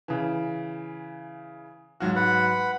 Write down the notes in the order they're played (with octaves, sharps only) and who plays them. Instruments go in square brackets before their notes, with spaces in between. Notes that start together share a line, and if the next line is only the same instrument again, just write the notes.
[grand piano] C#3 E3
[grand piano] G#2 F#3 F#4 [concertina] F5
[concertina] B4 F#5